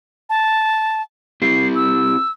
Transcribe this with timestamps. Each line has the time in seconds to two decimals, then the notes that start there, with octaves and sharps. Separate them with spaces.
0.29 A5
1.42 C4 E4 G4 C7
1.75 E6